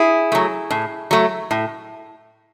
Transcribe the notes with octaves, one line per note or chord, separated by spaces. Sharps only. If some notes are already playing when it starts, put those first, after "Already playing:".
Already playing: E4 G#4
F#3 A3
A2
F#3 A3
A2